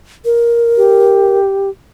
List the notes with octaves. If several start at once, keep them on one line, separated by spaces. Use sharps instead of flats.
A#4
G4